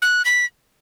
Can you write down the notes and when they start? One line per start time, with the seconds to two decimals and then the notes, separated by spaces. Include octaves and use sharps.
0.02 F#6
0.25 B6